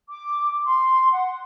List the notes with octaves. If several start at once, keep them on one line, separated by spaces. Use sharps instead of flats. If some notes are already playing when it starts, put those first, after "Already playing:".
D6
C6
F#5